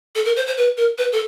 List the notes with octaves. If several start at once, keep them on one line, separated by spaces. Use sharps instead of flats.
A4
A#4
C5
C5
B4
A#4
B4
A4